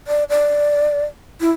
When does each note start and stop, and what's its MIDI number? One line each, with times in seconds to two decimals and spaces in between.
0.07 0.24 74
0.30 1.05 74
1.41 1.50 64